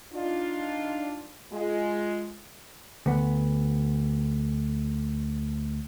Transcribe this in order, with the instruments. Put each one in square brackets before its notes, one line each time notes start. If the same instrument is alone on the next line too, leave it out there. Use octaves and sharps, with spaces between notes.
[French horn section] D4 D#4 F4
G#3 F4
[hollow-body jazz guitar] D2 B3